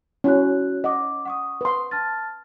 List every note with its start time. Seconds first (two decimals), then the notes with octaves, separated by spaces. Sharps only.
0.24 C#4 E4 F#4 F#6
0.84 D#5 F#5 D6
1.25 F#5 C#6 D#6
1.61 B4 C6
1.91 A5 F6 A6